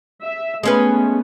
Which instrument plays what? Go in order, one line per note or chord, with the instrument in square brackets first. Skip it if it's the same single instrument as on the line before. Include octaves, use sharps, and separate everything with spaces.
[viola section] E5
[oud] G#3 C#4 B4 [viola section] A3 B3